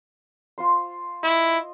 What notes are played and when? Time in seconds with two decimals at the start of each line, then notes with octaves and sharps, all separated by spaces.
0.58 F4 C5 C6
1.23 E4 D#5